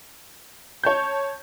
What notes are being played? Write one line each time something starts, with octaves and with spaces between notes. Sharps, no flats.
C#5 A5 G6